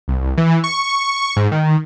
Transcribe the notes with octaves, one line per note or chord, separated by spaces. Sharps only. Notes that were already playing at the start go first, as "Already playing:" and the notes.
C2
E3
C#6
G#2
D#3